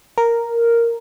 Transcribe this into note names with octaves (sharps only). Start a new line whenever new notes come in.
A#4